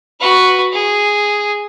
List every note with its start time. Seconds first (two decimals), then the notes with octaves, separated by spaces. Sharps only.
0.20 F#4 B4
0.73 G#4